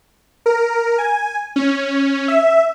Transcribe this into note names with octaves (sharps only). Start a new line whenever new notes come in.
A#4
G#5
C#4
E5